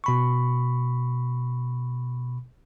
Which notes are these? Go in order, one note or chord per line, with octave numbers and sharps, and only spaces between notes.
B2 B5 C#6